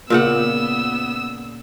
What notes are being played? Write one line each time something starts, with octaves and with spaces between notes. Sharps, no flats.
A#2 C#3 B3 F#5 E6